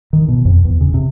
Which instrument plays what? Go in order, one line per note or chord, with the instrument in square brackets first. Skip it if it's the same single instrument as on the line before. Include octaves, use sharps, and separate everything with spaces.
[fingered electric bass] D#3
B2
F2
E2
C#3
C3